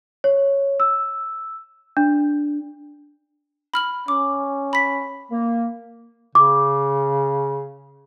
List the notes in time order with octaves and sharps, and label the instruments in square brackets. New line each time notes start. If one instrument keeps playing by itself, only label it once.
[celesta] C#5
E6
D4
[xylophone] B5 F6 F#7
[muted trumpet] C#4 [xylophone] D6
[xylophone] B5 B6
[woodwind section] A#3
[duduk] C#3 [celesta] D6